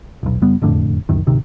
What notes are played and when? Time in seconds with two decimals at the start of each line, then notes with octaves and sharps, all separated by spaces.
0.23 D#1 B1
0.42 F#1 G3 B3
0.62 E1 F2 A2 D3
1.09 D1 C2 F#2 D#3
1.27 D1 G#1 C3 D#3